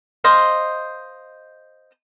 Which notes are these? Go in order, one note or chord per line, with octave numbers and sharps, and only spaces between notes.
C5 D#5 F5